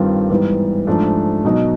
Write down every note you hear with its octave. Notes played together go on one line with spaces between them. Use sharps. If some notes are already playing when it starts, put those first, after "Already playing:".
Already playing: G2 D#3 G3 C4 F4
G#2 E3 G3 B3
G#2 F3 A3 D4
B2 F#3 B3 D#4